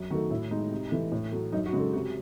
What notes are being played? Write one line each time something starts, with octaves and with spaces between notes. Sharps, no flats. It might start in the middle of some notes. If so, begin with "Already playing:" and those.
Already playing: F#2
D#3 F#3 A3 F#4
A2 E4
G#3 D#4
C3
E3 A3
A2
F#3 A3
F#2 D#4
F#4
C#3 G#3
A4
C3 F#4